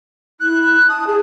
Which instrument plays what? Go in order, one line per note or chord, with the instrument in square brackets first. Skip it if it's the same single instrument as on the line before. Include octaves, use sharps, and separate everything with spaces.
[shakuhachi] E4 [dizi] F#6
[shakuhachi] A5 [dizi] D#6
[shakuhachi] G#4